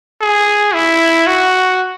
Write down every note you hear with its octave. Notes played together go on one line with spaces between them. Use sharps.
G#4
E4
F#4